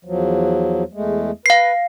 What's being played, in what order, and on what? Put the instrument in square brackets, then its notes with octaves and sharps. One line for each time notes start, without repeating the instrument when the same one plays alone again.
[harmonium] E2 F3 F#3
E2 G#3 A3
[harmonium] B4 [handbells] F5 C7